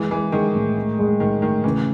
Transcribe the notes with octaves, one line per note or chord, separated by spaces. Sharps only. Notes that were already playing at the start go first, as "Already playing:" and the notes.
Already playing: E3 G#3
E3 G#3
D#3 G#3
A2
A2
G#3
A2 D#3
A2 D#3
C#3 E3